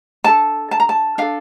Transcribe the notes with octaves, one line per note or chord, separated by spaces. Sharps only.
D4 A4 A5
A5
A#5
A5
D4 A4 F5